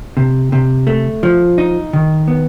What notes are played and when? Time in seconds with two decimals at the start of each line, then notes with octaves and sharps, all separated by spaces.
0.17 C3
0.52 C3
0.87 A3
1.23 F3
1.58 D#4
1.93 D#3
2.28 B3